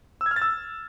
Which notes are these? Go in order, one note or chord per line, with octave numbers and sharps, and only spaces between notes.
E6
G#6
F6
A6
E6